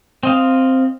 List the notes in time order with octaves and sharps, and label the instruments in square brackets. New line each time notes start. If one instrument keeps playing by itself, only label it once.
[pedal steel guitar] C4 D#5 F5